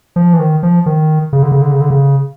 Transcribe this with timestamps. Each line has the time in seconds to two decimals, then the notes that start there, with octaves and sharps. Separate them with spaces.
0.16 F3
0.34 E3
0.39 D#3
0.63 F3
0.86 D#3
1.33 C#3
1.43 D3
1.52 C#3
1.62 D3
1.71 C#3
1.81 D3
1.90 C#3